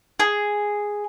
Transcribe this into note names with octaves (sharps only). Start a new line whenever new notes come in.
G#4